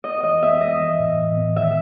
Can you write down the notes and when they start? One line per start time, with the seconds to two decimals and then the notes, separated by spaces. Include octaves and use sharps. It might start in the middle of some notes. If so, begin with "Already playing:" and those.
0.04 B3 D#5
0.23 E3 D#5
0.42 B3 E5
0.61 G#3 D#5
0.81 E3
0.99 A2
1.19 E3
1.37 B3
1.56 D#3 E5